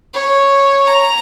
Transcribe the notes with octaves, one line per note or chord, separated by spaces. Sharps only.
C#5
A#5